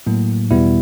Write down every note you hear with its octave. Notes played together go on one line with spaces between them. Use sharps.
A2 F#3 A#3
E2 B2 G3 B3 E4